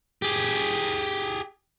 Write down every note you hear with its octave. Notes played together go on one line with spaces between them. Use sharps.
G4 G#4